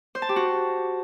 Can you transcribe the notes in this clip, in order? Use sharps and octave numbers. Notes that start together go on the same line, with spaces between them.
C5
A5
G4
F#4